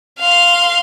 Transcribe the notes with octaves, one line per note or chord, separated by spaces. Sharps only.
F5 C6